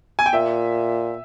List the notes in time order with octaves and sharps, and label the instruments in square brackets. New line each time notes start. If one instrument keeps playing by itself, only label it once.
[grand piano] G#5
G5
[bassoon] A#2 [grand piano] E5